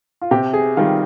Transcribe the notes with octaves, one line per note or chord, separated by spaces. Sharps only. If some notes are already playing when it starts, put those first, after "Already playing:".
F4
C3 G4
G#4
D#3 G3 F4